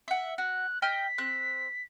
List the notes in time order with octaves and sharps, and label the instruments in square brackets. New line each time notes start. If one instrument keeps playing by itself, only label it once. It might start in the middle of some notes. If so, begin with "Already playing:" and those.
[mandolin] E5 F#5
[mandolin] F#4 [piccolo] F#6
[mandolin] D#5 G5 F6 [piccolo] B6
[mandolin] C4 F#6